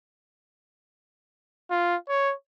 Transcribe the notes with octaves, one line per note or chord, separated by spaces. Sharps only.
F4
C#5